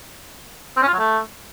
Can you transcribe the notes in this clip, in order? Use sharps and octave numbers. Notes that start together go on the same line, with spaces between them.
C4
C#4
F4
F#3
A3